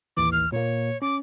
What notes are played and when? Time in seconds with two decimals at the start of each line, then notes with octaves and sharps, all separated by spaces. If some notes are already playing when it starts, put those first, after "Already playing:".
0.17 A1 D#2 E3 D6
0.32 F6
0.52 A#2 A#3 C#5
1.02 C#4 D6